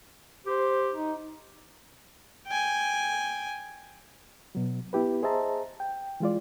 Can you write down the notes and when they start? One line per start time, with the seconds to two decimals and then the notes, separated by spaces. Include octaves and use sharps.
0.46 G4 C5
0.94 D#4
2.47 G5 G#5
4.55 B2 F#3
4.93 B3 E4 G4 B4
5.23 G#4 C5 D#5 E5 A5 A#5
5.80 G5
6.20 E3 G#3 F4 D5